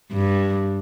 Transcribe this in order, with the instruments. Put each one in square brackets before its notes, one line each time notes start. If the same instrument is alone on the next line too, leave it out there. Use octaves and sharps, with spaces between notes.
[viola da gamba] G2